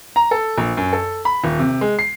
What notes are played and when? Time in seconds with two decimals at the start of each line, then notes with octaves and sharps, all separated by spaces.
0.16 A#5
0.31 A4
0.58 A#1
0.77 F#2
0.93 A4
1.25 B5
1.44 D#1
1.59 C3
1.81 G#3
1.99 C7